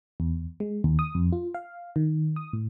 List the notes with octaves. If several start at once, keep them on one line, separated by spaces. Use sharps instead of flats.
E2
G#3
D#2
D#6
F2
F4
F5
D#3
D#6
A2